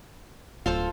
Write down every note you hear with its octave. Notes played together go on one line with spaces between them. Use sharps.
D1 F4 A4 C5